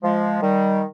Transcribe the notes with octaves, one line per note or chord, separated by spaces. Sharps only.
F3 G#3
D#3 G3